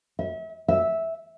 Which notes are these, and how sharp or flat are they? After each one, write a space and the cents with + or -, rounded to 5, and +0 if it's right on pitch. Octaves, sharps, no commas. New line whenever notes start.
E5 -35
E5 -10